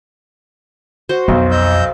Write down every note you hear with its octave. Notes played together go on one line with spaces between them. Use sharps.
F#4 C5
B1 F2
D#5 E6 G6